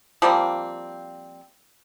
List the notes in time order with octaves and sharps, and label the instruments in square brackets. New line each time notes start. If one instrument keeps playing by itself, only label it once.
[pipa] F3 G3 A#3 C4